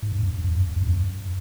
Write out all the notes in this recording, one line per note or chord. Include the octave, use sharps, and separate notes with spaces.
G#2
G2
F#2
F#2
F2
F#2
F2
F2
G2
F#2